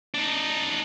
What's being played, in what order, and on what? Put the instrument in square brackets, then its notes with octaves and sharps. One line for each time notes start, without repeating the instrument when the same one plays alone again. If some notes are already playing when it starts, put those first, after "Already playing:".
[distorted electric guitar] D4 D#4